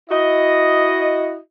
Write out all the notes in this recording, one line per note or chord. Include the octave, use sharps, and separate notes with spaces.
E4 F#4 D#5